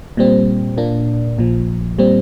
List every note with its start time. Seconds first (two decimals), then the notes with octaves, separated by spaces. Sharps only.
0.17 A#2 G3 C4
0.77 A#2 A#3 D4
1.38 A#1 A#2 F3
1.98 A#2 G3 C4